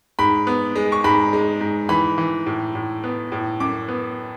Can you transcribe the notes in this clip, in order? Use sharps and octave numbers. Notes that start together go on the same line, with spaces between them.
G#2 B5
B3
G#3
C#6
G#2 B5
G#3
G#2
E3 B5
E3
A2
A2
B3
A2
F#2 D6
B3